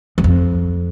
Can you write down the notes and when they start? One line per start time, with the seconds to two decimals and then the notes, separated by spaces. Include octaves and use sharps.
0.18 E2
0.24 F2